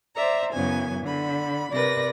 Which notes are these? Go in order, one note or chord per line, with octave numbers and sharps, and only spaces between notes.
C5 D5 E5 A#5
F#2 C#3 E3 B3 G#5
D3 B5
C3 A#4 B4 D5 A#6